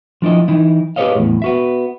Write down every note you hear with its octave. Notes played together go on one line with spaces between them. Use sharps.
F3 D4 E4 D#5
E3 D#4 E4
G4 G#4 B4 C#5 D#5 F5
E2 A2
B3 F#4 E5